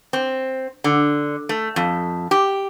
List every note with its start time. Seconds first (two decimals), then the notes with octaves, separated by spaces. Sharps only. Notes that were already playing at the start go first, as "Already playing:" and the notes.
0.13 C4
0.84 D3
1.49 A3
1.76 F2
2.31 G4